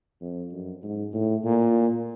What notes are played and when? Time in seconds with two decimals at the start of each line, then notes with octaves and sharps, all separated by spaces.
0.21 F2
0.52 F#2
0.83 G#2
1.13 A2
1.44 A#2